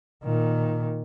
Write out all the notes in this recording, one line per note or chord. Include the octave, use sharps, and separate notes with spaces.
A#2 D#3